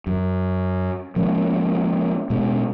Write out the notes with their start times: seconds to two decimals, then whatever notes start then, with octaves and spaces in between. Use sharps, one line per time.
0.07 F#2
1.16 F3 G#3 A#3 C#4
2.30 B2 G#3 C#4